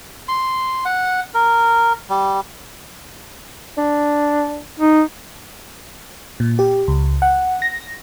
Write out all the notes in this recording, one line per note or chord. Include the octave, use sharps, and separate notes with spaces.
C6
F#5
A#4
G3
D4
D#4
A#2
G4
C#2
F#5
A#6